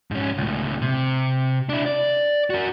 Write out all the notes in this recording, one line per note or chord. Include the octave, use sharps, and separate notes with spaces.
G#2 C#4
C#2 A2
C3
D4 E4
D5
F#4 A#4